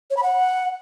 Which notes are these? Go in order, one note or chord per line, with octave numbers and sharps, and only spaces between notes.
C#5
B5
F#5